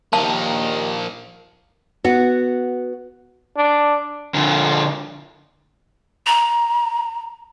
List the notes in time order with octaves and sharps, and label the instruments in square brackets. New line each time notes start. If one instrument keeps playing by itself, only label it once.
[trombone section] D#2 D#3 [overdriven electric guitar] F3 A#3 [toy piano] A5
[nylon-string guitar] B3 F#4
[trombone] D4
[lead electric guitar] D3 F3
[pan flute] A#5